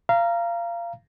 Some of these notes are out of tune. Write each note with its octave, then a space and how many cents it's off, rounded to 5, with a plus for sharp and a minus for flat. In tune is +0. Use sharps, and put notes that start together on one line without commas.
F5 -25 A#5 +0